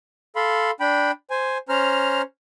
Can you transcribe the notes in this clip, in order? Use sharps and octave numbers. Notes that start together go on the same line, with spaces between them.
A4 F5 B5 C6
D4 G5 B5
C5 G#5
C#4 C5 A#5 F6